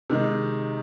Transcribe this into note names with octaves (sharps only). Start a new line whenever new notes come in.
C3 D#3 G#3 D#4